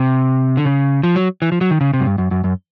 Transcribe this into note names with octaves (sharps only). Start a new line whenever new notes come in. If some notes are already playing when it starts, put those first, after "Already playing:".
Already playing: C3
D3
C#3
F3
F#3
E3
F3
F#3
D#3
C#3
C3
F#2
G2
F#2
F#2
F#2